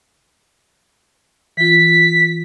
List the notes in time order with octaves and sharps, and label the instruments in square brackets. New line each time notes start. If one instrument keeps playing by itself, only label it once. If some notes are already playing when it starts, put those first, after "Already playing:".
[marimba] E3 F4 [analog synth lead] B6